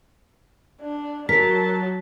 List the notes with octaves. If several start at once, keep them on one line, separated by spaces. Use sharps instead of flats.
D4
F#3 A#4 A5 B6